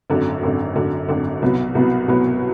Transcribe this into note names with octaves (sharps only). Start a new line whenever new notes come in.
G#1 F#2 D3
G#1 F#2 D3
G#1 F#2 D3
G#1 F#2 D3
C2 B2 F#3 B3
C2 B2 F#3 B3
C2 B2 F#3 B3